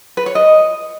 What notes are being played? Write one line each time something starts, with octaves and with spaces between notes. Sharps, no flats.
B4
C#5
D#5